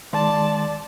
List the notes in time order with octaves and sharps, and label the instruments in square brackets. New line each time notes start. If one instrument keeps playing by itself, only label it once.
[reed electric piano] D#3 G#3 C6 [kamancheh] D5 A5